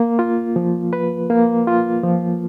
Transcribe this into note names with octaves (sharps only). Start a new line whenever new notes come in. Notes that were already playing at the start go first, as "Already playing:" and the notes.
Already playing: A#3
F4
F3
B4
A#3
F4
F3